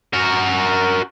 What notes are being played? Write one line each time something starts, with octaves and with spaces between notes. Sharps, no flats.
F#4 A#4